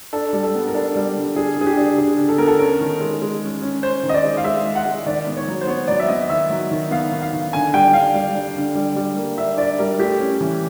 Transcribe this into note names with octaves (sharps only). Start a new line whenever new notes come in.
D4 A4
G3
A4
B3
A#4
D4 A4
G3
D3
D4 G#4
D3 G#4
G4
D4
D3 G#4
D3
A4
B3 A#4
A4
C#4 A#4
D#3
G#3
G#3
C#4
C#4
C#4 C5
D#3
D#5
D5
G#3
F5
G#3 E5
G#3
F#5
G#3
D#3 D5
B3
C#5
F#3
C5
B3 C#5
F#3 D5
E5
B3 D#5
D#3 E5
F#3
D#3
B3 F5
D#3
F5
D#3
D3 G#5
G3 G5
D4 F5
G3
D4
D3
G3
G3
A#3
D4 E5
D4 D5
G3 A#4
A3 G4
C#4
E3